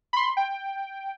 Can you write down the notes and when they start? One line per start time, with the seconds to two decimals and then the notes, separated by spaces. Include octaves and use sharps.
0.13 B5 C6
0.37 G5